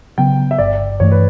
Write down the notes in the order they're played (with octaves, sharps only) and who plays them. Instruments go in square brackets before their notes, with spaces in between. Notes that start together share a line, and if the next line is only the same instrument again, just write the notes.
[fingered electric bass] C#3 F#3 B3 [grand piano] G5
[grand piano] E5
[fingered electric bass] G1 [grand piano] D5
[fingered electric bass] G2 E3 A3 [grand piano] C#5
[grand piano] B4